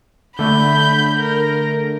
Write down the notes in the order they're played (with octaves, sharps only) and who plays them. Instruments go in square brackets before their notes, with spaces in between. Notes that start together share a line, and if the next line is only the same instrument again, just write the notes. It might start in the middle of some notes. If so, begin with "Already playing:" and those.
[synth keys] D3 A3 [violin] B5 G6
[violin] A#4